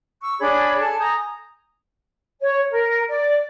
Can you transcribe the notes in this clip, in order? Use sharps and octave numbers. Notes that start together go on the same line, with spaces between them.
C#6 E6
D4 G#4 C#5 B5
A4 G#5 A5
G#5 A#5 D#6 G6
C#5
A#4
D5